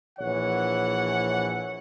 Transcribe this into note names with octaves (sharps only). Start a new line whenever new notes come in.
A#1 E3 C#5 F#5